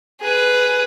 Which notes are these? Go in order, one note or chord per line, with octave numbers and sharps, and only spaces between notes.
G#4 B4